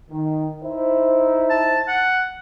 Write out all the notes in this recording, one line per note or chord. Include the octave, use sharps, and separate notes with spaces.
D#3
D#4 E4 C5
A5
F#5